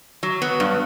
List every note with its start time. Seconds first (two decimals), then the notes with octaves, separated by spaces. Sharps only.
0.23 F#3
0.42 B3
0.60 G2